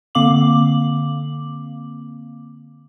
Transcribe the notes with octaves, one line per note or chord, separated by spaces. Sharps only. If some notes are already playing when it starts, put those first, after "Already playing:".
D3 A#3 C4 F5 D6 F#7